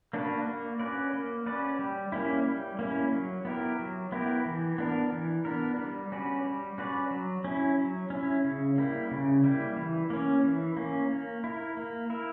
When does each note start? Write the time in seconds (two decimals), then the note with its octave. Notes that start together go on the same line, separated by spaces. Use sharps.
0.13 A#3 D4 F#4 B4
0.46 A#3
0.79 C#4 F#4 B4 D5
1.13 A#3
1.46 C#4 F#4 B4 D5
1.79 G3
2.12 A#3 C#4 E4
2.46 G3
2.79 A#3 C#4 E4
3.12 F#3
3.45 B3 E4 G4 A#4
3.79 F#3
4.12 B3 E4 G4 A#4
4.45 E3
4.78 B3 D4 A#4
5.12 E3
5.45 B3 D4 A#4
5.78 G3
6.12 C#4 F#4 B4 D5
6.44 G3
6.78 C#4 F#4 B4 D5
7.11 F#3
7.45 C#4 E4
7.78 F#3
8.10 C#4 E4
8.44 C#3
8.78 G3 A#3 E4
9.11 C#3
9.44 G3 A#3 E4
9.76 E3
10.10 A#3 C#4
10.44 E3
10.77 A#3 C#4
11.11 A#3
11.44 E4 A#4
11.77 A#3
12.10 E4 A#4